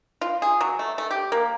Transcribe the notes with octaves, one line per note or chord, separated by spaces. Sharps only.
F4
G#4
F#3
A3
A3
G4
A#3